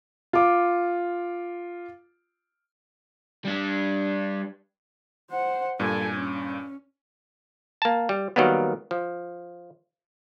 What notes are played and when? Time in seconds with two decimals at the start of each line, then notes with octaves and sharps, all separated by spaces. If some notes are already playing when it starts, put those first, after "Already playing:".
0.33 F4 D6
3.45 G3 D4
5.31 C5 F#5
5.80 G2 A#2 A4 G#5
6.13 C#4
7.82 A#3 A5
8.09 G3
8.36 D#3 F#3 G3 A#3 B3
8.91 F3